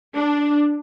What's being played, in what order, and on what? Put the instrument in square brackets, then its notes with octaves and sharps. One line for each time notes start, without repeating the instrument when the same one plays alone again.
[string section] D4